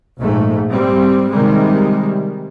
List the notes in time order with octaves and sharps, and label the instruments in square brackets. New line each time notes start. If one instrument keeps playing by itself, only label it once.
[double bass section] A#1 G#2 A3
G3 C4
C3 D#3 G3 G#3